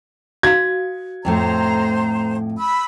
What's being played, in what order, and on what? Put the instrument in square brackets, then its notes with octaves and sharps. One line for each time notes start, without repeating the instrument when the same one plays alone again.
[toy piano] F#4 F5 [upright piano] G#6
[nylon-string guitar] F2 A2 A3 [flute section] C5 A#5
[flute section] B5 E6